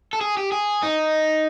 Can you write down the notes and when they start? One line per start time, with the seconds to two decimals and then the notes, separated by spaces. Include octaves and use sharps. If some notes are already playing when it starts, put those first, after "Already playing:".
0.13 A4
0.21 G#4
0.37 G4
0.52 G#4
0.83 D#4